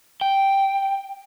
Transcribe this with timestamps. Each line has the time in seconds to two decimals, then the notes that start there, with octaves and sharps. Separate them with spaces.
0.21 G5